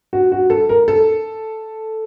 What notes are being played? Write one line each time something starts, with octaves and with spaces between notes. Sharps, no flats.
F#4
F#4
A4
A#4
A4